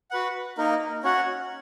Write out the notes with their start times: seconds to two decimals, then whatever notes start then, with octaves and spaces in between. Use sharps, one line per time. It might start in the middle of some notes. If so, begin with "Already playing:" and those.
0.11 F#4 B4 F#5
0.58 A#3 D#4 A#4
1.04 C#4 F#4 C#5 F#5